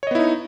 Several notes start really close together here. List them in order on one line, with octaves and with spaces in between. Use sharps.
C#5 D#5 B3 E4 D#4